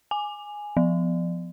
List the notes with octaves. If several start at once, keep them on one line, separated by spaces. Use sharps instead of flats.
G#5
F3